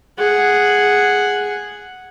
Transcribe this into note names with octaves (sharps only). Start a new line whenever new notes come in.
G#4 F#5